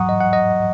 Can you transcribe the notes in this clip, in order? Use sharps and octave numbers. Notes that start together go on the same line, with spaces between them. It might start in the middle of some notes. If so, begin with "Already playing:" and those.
Already playing: G#2 F#3 F#5 A#5 C#6 D#6
D#5
F#5
D#5